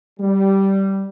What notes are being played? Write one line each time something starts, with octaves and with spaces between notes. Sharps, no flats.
G3